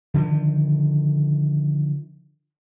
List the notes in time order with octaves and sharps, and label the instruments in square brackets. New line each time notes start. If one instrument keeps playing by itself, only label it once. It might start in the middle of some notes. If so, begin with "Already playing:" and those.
[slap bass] D3 D#3 F3